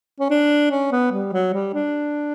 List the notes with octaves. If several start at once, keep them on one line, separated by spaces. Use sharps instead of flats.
C#4
D4
C#4
B3
G3
F#3
G3
D4